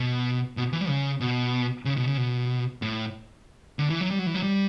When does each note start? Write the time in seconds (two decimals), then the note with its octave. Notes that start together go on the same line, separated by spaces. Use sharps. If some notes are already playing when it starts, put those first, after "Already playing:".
Already playing: B2
0.57 B2
0.73 E3
0.81 G3
0.89 C#3
1.21 B2
1.85 C#3
1.97 B2
2.07 C#3
2.17 B2
2.82 A2
3.79 D3
3.90 E3
4.00 F#3
4.11 G3
4.19 F#3
4.26 E3
4.34 F#3
4.43 G3